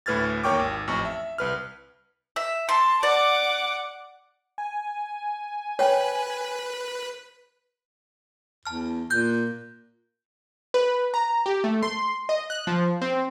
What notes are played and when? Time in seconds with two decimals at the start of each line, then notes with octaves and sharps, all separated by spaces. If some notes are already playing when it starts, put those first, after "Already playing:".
0.06 D2 A2 B4 F6 G#6 A6
0.43 D#2 A#4 C#5 G5 C#6 D6
0.59 G#1
0.88 A1 F2 C#6
1.05 E5
1.38 C2 B4 F6
2.36 E5
2.69 A5 C6
3.03 D5 F#5 D6
4.58 G#5
5.79 B4 C#5 G5
8.66 E2 A5 F6
9.10 A#2 F#6 G6
10.74 B4
11.14 A#5
11.46 G4
11.64 A3
11.83 C6
12.29 D#5
12.50 F#6
12.67 F3
13.02 C4